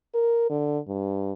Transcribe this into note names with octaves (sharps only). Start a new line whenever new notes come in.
A#4
D3
G2